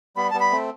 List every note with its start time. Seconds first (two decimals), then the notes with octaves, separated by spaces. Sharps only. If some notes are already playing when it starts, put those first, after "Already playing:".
0.16 G3 B3 B5
0.30 G3 B3 A5
0.40 B5
0.51 A3 C4